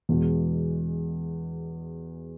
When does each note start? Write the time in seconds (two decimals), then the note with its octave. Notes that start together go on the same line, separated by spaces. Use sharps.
0.09 E2 B2 G#3